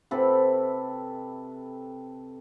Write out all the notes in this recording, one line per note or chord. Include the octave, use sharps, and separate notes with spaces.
C3 A4 B4